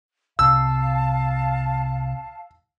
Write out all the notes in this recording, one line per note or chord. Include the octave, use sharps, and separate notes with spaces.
C2 C3 F5 A5 E6